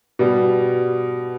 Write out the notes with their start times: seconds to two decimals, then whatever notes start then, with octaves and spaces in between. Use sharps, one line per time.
0.19 B2 G3